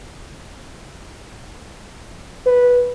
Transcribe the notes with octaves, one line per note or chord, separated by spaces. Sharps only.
B4